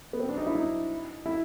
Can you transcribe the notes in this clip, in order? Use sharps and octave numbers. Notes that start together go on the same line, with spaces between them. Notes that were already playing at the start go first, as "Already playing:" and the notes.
B3
C4
D4
D#4
E4
D#4
E4